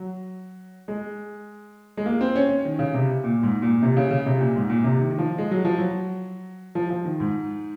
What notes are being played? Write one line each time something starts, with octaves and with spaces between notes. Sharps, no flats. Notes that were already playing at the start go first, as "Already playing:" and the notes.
Already playing: F#3
G#3
G#3
A#3
C4
C#4
C#4
D#3
C#3
C3
A#2
G#2
A#2
C3
C#3
C#3
C3
A#2
G#2
A#2
C3
D#3
D#3
F3
G#3
F#3
F3
F#3
F3
F3
D#3
G#2